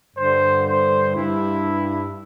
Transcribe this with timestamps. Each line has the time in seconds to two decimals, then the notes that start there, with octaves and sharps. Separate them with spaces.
0.17 G2 D3 C5
0.66 C5
1.15 G2 E4